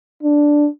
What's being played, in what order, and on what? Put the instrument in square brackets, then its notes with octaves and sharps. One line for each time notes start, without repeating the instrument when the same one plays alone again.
[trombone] D4